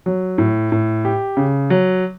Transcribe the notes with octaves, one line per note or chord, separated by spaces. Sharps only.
F#3
A2
A2
G4
C#3
F#3